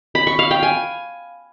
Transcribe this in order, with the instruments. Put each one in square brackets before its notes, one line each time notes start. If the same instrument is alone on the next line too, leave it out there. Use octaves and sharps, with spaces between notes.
[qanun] B5
C#6
F5
G5
G#5